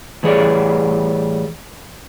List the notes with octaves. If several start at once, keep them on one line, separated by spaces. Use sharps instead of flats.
A2 E3 G3 G#4 C#5 D5